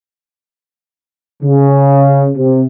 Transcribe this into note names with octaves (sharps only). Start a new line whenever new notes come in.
C#3
C3